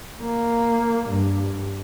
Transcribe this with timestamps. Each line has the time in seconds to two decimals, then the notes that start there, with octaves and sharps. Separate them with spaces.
0.22 A#3
1.09 G2